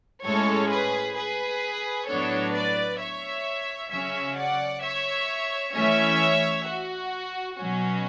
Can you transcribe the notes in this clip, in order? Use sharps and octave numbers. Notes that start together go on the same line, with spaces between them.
A2 G#3 C#4 A4 C#5
G#4 B4
G#4 B4
A2 F#3 B3 D4 A4 C#5
B4 D5
C#5 E5
C#3 F#3 C#4 C#5 E5
D5 F#5
C#5 E5
E3 A3 C#4 C#5 E5
F#4
B2 F#3 C#4 F#4